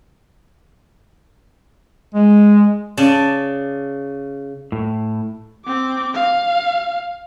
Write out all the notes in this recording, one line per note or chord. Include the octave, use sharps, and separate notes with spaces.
G#3
C#3 D5 A5
A2
C4 D6
F5